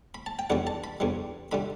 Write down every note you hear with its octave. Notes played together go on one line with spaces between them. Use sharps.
B5
A5
G5
E2 D3 G3 F#5
A5
B5
E2 D3 G3
D3 G3 B5